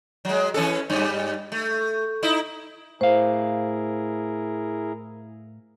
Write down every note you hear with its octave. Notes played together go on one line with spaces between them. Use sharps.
F#3 G#3
E3 C#4 A4
G2 G3
A3
D#4 E4
A2 E4 G#4 A#4 C5 F5